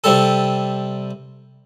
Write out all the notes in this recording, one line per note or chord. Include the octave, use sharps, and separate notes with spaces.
C3 G3 A4